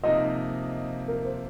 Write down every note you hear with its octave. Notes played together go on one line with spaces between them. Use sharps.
C3 F3 A#3 D#4 D#5
A#4
C5